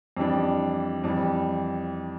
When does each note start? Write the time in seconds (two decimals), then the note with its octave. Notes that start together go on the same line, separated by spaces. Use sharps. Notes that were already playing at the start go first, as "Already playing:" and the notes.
0.17 F2 E3 G3 D4
1.04 F2 E3 G3